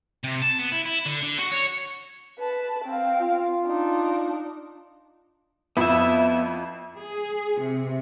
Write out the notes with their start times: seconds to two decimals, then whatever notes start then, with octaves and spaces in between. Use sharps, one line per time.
0.24 C3
0.42 A5
0.59 B3
0.72 E4
0.86 E4
1.06 D3
1.23 D3
1.39 F#4
1.52 C#5
2.39 B4 A5
2.84 C4 F5
3.21 F4
3.66 D4 D#4
5.77 F2 B3 E4 E5
6.99 G#4
7.60 C3